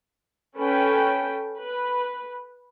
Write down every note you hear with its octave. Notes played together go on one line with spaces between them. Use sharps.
C#4 A4 B4 G5
B4